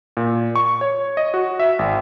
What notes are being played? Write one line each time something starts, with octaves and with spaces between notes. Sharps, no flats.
A#2
C#6
C#5
D#5
F#4
E5
G#1